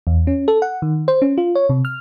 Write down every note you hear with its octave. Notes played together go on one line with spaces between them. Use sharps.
E2
C#4
A4
F#5
D#3
C5
C#4
F4
C#5
C3
F6